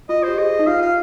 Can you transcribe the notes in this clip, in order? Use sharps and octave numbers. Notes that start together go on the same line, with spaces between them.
F4 D#5
G4 C5
G#4 D#5
D#4
F4 F5
F5